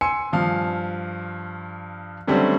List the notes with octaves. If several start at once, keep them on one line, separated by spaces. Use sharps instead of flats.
G#5 C6 E6 C#7
G2 F3 F5
D3 F#3 G3 A3 C4 C#4